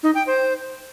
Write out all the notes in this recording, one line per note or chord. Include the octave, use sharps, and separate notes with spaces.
D#4
G5
C5